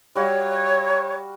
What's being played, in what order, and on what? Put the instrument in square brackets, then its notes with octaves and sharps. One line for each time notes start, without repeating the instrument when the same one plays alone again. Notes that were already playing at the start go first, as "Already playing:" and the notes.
[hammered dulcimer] G3 F#4 F5 [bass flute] C#5